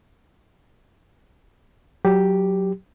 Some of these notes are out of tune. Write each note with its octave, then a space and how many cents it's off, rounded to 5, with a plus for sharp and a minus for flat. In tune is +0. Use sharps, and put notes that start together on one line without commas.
F#3 +0 G4 +0